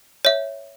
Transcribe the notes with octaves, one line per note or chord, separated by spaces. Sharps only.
C#5 E5